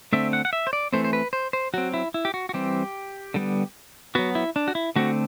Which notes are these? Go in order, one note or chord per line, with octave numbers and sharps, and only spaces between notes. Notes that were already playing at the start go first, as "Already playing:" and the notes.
D3 A3 C4 E5
F#5
F#5
E5
C5
D5
E3 A3 C4 C5
C5
B4
C5
C5
F#3 C4 F#4
E4
E4
G4
F#4
F#4
E3 G3 C4 G4
D3 G3 B3
F#3 B3 F#4
E4
D4
F#4
E4
D3 A3 C4 F#4